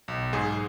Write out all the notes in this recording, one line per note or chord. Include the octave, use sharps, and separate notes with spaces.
B1
G#2 G#4